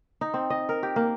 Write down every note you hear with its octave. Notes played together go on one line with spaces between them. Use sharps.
D#4
C4
D#5
A#4
G4
A#3